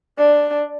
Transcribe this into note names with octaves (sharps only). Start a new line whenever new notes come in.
D4